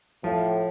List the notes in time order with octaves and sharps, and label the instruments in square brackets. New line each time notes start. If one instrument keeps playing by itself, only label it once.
[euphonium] A2 [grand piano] F3